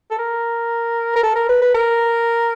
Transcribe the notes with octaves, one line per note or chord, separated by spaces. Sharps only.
A4
A#4
A#4
A4
A#4
B4
B4
A#4